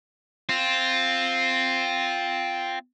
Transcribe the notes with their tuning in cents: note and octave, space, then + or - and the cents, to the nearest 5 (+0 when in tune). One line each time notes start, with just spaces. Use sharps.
C4 +0 F4 +0